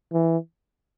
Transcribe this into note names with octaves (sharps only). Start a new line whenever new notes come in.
E3